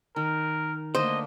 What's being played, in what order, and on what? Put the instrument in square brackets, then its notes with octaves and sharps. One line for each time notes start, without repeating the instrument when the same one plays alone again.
[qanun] D#3 [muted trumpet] A#4
[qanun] D3 A3 A#3 [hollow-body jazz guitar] C5 [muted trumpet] D#5